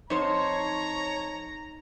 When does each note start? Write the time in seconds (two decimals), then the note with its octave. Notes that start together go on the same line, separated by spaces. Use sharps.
0.10 F2 D#4 C5 C#5 A#5